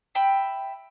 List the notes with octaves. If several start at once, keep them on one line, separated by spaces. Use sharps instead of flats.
E5 G5 B5